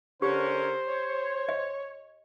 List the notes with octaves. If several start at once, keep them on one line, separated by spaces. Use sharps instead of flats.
D3 C#4 G4 A#4 C5
C#5
D#5